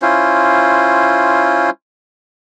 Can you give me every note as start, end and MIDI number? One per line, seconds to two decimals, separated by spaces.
0.02 1.70 61
0.02 1.70 64
0.02 1.70 65
0.02 1.70 72